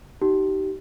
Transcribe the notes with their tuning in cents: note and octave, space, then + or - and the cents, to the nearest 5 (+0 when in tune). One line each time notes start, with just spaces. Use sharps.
D#4 +0 G4 -30